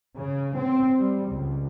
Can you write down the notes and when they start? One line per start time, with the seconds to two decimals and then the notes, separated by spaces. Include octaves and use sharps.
0.16 C#3
0.56 C4
0.99 G3
1.29 C#2